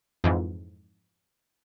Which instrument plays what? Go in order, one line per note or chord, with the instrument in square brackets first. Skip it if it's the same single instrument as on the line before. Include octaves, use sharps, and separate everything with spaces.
[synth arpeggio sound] F2 G#2 E3